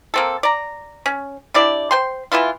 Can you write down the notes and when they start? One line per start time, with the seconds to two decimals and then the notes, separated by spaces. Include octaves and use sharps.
0.14 A#3 C4 A4
0.43 D5 A#5
1.06 C#4
1.54 D4 E4 G4 D5
1.91 C5 G5 C6
2.32 E3 B3 E4 F4